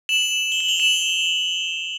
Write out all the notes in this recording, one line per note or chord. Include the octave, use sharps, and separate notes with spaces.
E7 F#7
G7
F#7
F7 G7
E7 F#7